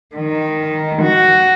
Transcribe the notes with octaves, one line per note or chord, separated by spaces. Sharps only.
D#3
F#4